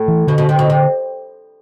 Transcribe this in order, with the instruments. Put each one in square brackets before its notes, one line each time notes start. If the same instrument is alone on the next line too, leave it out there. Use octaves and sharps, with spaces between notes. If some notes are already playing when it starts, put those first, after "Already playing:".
Already playing: [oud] A2
[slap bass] E3
[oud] B2 [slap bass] D3
[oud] B2
C3
B2
C3